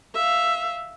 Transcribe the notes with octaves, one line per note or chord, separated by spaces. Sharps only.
E5 F5